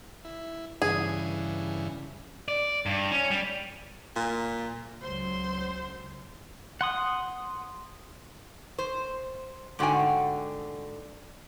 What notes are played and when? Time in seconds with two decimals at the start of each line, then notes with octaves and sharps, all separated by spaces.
0.25 E4
0.82 G2 C#3 E3 G#4
2.48 D5
2.86 G2
3.12 C#4
3.31 G3
4.16 A#2
5.02 C#2 F#3 C5 C6
6.81 F#5 C6 D#6
8.79 C5
9.79 G#2 D3 F#4 G5 G#5